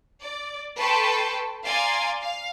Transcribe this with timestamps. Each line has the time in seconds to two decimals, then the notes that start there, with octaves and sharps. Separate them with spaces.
0.21 D5
0.77 A4 B4 G5 A5 C6 C#6
1.66 D5 F5 G#5 A#5 C6 A6
2.21 F5